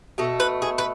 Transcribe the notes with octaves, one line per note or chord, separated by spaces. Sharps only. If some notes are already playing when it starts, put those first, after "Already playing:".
B2 A3 A4
B4
G#4
B4